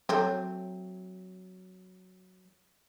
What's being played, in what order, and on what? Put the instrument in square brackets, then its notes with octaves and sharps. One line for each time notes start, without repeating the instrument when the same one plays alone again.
[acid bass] F#3 [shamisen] A3 C4